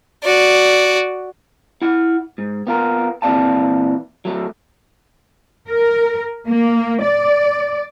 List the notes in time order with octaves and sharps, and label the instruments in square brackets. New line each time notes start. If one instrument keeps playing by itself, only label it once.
[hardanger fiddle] F#4 D5
[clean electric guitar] E4 F#5
G#2
B3 F4 A#4
A#2 E3 C4 D5 F5 A5
F#3 A3
[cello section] A#4
A#3
D5